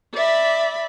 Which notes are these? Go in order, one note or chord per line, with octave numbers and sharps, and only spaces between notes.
D5 E5 B5